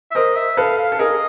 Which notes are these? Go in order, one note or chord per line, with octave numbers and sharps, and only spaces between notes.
E5
A#4 C5 D#5
E5
A4 B4 F5
F5
A4
G#4 A#4 D#5